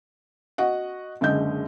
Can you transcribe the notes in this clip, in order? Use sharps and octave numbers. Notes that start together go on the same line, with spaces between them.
F#4 D#5 F#5
F#1 D3 G#3 D#5 G6